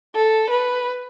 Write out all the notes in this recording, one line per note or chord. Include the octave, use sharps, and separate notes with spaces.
A4
B4